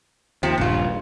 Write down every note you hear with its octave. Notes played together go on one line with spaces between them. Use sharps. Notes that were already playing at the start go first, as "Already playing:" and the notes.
D#2 C3 F3 C4
D#1 A#1 G2 C#3 F4